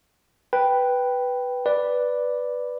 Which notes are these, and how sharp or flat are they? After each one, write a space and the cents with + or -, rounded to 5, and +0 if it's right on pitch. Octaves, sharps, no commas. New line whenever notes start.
B4 +0 G5 +0
B4 +0 D5 +0